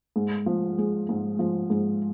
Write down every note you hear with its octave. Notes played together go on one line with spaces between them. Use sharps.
G#2
F3
G#3
G#2
F3
G#2